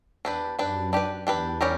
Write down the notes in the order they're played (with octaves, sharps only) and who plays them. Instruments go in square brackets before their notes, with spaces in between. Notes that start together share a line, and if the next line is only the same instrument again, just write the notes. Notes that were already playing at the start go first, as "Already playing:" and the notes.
[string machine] E2 [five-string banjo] D4 G4 B4
[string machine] F#2 [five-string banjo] D4 G4 B4
[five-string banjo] D4 G4 B4
[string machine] E2 [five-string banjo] D4 G4 B4
[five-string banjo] G3 C#4 G4 A#4